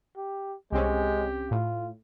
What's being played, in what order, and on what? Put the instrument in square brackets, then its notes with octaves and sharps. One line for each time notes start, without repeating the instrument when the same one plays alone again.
[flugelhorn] G4
[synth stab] C2 C4 C#4 [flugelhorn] G#3 [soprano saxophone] G4
[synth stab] A2 [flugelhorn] F4